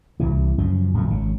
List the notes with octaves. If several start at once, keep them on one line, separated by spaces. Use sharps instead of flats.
C2 C3 E3
F#2 C#3 F3
D1 F#2 A3
G#1 C#3